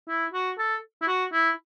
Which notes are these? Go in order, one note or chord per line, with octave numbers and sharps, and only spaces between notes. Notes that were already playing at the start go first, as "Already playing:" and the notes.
E4
F#4
A4
E4
F#4
E4